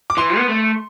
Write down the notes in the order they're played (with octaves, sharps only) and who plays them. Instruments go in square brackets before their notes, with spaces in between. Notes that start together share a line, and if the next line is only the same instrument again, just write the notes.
[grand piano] D6
[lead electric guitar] E3 [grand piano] C6
[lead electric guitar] B3
A3